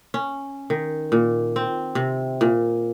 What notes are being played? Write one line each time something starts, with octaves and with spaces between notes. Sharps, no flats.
C#4
D#3
A#2
C4
C3
A#2